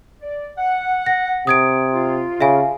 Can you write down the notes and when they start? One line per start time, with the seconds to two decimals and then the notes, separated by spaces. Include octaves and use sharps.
0.21 D5
0.58 F#5
1.06 A#6
1.47 C3 D#6 G#6 D7
1.93 F4
2.41 C#3 E5 F5 G#5